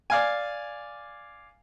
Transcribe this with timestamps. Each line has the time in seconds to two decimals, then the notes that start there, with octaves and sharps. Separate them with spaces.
0.10 D5 F5 G#5